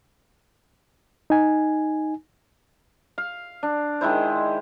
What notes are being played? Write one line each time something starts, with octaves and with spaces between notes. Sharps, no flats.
D#4 G#5
F5
D4
D#3 G#3 E4 C5